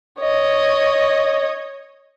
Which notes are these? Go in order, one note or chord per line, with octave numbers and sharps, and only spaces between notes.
C#5 D#5